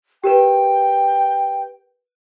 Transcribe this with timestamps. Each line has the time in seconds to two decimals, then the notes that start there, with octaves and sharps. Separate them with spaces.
0.24 G4 A#4 B4 G5